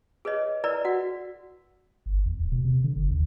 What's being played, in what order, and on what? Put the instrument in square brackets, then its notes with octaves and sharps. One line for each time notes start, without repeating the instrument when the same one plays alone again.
[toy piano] G#4 B4 C#5 D#5
E4 A#4 B4 D5 A#5
F#4 F#5
[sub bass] G1
E2
D1
B2
C3
D3
F#1
D#2